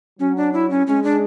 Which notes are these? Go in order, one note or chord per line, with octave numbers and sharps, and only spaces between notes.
F#3 C#4
D4
E4
C#4
G#3 C#4
D4